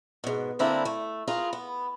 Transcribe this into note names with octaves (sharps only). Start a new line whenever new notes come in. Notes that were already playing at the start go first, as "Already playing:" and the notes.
G#2 B2
D3 G3 A#3 C4 D4 E4
A3
F4 G#4 A#4 B4
B3